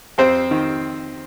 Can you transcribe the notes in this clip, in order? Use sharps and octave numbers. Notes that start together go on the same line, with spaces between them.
F2 C4 C5
D#3